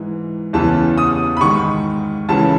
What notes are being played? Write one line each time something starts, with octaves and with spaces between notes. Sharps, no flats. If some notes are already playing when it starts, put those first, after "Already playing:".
Already playing: G#2 E3
E2 C#3 E3 A5
D#6
B5
G#2 D#3 C#6
C#2 C#3 E3 A5